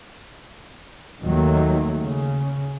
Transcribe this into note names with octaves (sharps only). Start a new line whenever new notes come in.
D#2 D#3 F#3 A3 A#3
C#3